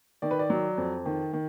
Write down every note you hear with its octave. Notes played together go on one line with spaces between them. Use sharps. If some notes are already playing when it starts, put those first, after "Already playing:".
D#3 D5
B4
D5
F#3
F2
D#3
D#3